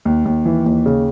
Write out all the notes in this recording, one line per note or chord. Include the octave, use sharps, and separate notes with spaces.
D#2
D#2
E3
D#2
C#3